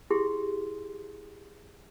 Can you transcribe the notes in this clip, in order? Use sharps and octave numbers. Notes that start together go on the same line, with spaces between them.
E4 G4 G#4 C6